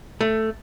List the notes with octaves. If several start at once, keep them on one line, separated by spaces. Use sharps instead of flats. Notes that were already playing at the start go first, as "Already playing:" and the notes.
A3